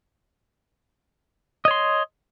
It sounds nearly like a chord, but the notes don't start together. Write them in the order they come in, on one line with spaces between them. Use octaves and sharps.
D#5 C#5 C6